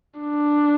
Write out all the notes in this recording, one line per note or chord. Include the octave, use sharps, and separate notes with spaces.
D4